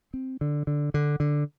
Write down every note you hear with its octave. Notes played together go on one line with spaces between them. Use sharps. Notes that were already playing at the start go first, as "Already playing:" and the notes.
C4
D3
D3
D3
D3